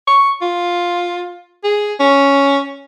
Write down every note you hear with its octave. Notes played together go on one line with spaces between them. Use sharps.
C#6
F4
G#4
C#4